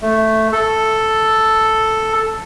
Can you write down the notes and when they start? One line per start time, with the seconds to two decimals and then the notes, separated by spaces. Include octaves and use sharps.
0.01 A3
0.52 A4